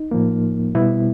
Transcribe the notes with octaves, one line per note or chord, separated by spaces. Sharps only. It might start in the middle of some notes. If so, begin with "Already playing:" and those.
Already playing: D#4
A2 F3 A#3
B2 G3 B3 E4